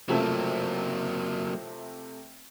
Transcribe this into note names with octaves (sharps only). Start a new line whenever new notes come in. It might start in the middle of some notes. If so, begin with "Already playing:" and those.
C3 F3 F#3 A3 A#3